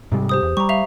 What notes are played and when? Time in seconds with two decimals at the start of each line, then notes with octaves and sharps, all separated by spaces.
0.12 G#2 C3 G3
0.29 G4 C5 D#6
0.43 E2
0.57 G3 A#5 C#6
0.69 E5 F5 F7